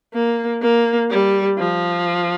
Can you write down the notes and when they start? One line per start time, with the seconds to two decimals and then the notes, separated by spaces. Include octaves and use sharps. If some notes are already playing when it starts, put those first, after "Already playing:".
0.14 A#3
0.62 A#3
1.10 G3
1.59 F3